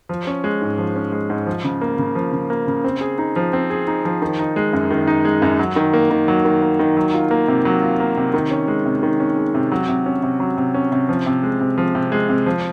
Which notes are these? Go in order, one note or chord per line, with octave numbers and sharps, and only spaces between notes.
F3
C#4
G#3
G#2
F3
C#4
G#3
G#2
F3
C#3
A#3
C#3
F3
C#3
A#3
C#3
C4
G#4
D#4
F3
C4
G#4
D#4
F3
D#3
D#4
G#3
F#2
D#3
D#4
G#3
F#2
F#3
D#3
A#3
D#3
F#3
D#3
A#3
D#3
F#3
F4
A#3
C3
F#3
F4
A#3
C3
D#3
C#4
G#3
C3
D#3
C#4
G#3
C3
F#3
C3
C#4
C3
F#3
C3
C#4
C3
F3
C3
G#3
C3
F3
C3
G#3
C3
F3